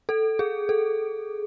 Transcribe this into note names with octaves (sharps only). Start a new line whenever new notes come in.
A4
G#4
A4